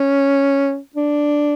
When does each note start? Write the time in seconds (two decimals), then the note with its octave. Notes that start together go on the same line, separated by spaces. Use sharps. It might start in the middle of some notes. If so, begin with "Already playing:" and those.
Already playing: C#4
0.95 D4